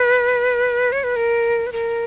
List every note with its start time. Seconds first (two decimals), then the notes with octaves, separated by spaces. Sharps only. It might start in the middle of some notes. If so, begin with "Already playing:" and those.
Already playing: B4
0.92 C#5
1.04 B4
1.16 A#4
1.67 B4
1.72 A#4